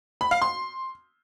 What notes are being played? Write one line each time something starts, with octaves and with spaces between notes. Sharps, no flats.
B5
F5
C6